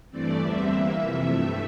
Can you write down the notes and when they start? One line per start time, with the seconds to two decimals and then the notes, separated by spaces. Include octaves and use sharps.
0.10 G2 E3 A3 C4 D5
0.39 E2 D3 G3 C4 E5
0.67 E2 E3 A#3
0.96 F2 C3 E3
1.23 G2 F3 A3 E5